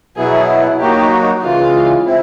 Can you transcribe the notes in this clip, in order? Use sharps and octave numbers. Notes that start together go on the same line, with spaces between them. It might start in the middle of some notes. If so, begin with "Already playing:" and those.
B2 F#3 B3 E4 G#4
F#3 A#3 D#4 F#4 G4
C#3 E3 G#3 F4
C4 E4